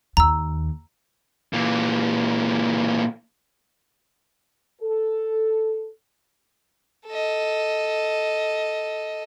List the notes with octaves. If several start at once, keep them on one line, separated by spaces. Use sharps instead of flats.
D#2 A#5 E6
A#2 E3
A4
A4 D#5